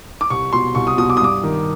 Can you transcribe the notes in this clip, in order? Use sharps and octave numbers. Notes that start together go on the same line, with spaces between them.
D6
C2 C#6
B2 C6
C2 C#6
D#6
B2 D#6
D6
D#6
G2 D6
D#3